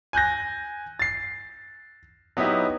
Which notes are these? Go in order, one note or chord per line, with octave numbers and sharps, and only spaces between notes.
G#5 F#6 G6 A#6
A6 C7
F#3 B3 D#4 E4 G4